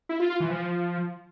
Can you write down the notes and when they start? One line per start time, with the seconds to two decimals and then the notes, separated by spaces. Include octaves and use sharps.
0.09 E4
0.20 F4
0.30 F4
0.40 E3
0.51 F3